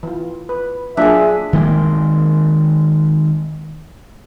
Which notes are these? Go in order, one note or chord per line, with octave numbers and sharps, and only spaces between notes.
E3 F4
B4
F#3 A#3 D4 F4 G#4 E5
D#3 G#3 A#3